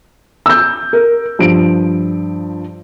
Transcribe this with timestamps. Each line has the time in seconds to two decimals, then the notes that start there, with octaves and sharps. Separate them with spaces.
0.46 E6 G6
0.93 A#4
1.39 G2 F3 D7